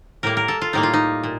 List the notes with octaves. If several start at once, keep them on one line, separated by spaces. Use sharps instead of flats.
A2 G3 A#3 A#4
A#4
A4
F4
A2 G3 A#3 D#4
F4
D#4
A#2